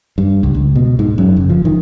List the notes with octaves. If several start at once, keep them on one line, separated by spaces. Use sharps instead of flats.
G2
C#2
C#2
B2
G#2
F#2
F#1
F3
D#3